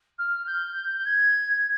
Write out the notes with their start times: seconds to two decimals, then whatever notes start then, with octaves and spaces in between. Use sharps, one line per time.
0.18 F6
0.46 G6
0.96 G6
1.05 G#6